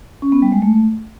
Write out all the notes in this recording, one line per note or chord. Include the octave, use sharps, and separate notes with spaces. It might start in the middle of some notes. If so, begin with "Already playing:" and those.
C#4
B3
G3
G#3
A3